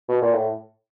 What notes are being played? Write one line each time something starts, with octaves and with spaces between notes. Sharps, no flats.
B2
A#2
A2